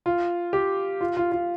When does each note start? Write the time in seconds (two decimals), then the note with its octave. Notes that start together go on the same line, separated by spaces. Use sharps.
0.06 F4
0.53 G4
1.01 F4
1.17 F4
1.32 F4